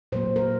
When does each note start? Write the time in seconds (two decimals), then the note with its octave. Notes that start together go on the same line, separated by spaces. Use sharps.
0.12 A#2 F#3 A#3 C5
0.36 A#4